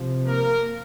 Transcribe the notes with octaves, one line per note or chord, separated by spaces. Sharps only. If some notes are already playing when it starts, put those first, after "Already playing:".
Already playing: C3 F3
A#3 A#4